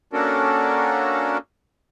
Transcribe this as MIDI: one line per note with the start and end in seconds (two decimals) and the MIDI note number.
0.13 1.38 58
0.13 1.38 61
0.13 1.38 62
0.13 1.38 66
0.13 1.38 69
0.13 1.38 70